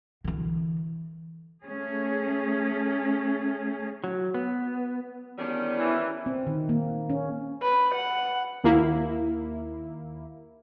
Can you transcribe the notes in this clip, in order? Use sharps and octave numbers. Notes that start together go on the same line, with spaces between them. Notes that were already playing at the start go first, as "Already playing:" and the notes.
D3 E3
A3 C#4 G#4
F#3
B3
E2 D#3 G3 C#4 D4
E3
C4
D#3
A#3
C#4
B4
F#5
D#2 A#3 E4